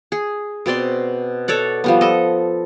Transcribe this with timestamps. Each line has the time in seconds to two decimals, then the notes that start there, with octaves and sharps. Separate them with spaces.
0.12 G#4
0.66 B2 C4 D5 C6
1.48 A4 C#5 D5 F#5
1.84 F3 G3 B3
2.01 A4 D#5